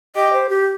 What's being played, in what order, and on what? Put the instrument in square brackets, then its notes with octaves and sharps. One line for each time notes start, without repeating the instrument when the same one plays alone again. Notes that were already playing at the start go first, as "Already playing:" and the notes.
[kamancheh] G4 [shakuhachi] D#5
[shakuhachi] C5
G4